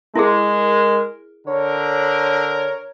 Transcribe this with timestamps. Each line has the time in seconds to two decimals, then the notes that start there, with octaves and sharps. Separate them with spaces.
0.15 G#3 E4 G#4 A#4
1.47 D3 A#4 C#5